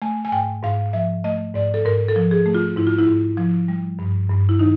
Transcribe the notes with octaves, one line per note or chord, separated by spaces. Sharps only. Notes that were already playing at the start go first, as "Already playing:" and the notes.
A3 G#5
G#5
G#2 G5
G#2 F5
F3 E5
A3 D#5
G#2 D5
A4
G#2 A#4
A4
F3
G#4
A3
F4
G#2 E4
F4
E4
G#2
F3
G3
G2
G2
E4
D#3 D#4